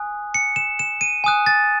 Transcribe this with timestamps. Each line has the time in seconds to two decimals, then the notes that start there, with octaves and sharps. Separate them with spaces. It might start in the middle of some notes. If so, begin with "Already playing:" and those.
Already playing: G#5 D#6 F#6
0.34 C#7
0.56 E7
0.79 E7
1.01 D#7
1.24 G#5 D#6 F#6
1.46 A6